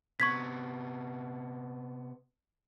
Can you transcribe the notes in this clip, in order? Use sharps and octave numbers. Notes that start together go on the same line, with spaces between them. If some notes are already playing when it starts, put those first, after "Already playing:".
C3 B3 C#6 G#6 B6